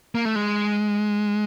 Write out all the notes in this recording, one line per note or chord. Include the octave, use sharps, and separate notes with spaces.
A#3
A3
G#3